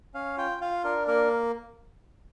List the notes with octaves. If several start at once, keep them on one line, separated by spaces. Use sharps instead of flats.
C#4 F5
F4 G5
F4 F5
D4 A#4
A#3 A#4